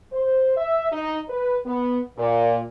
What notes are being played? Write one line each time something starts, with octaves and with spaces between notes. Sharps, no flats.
C5
E5
D#4
B4
B3
A#2